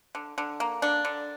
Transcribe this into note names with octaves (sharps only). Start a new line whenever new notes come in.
D3
D3
A#3
D3 D4
D3